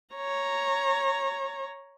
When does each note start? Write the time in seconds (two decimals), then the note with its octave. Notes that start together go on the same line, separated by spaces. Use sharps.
0.15 C#5 A#5